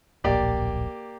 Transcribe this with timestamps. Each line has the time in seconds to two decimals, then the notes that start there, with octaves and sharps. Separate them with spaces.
0.24 D1 A#1 A#3 G4 D5